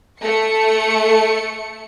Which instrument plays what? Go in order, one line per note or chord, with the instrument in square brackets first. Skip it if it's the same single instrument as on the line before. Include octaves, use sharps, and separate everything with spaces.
[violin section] A3 C#7